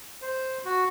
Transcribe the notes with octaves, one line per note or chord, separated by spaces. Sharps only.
C5
F#4